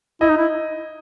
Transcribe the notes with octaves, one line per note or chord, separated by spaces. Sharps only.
E4 D#5
D#4
E4